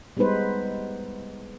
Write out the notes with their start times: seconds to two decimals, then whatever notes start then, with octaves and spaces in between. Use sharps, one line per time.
0.17 G3 G#3 B3 D#4 B4 C5